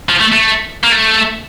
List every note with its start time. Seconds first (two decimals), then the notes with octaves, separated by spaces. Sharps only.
0.09 F3
0.20 A3
0.32 A3
0.84 A#3
0.91 A3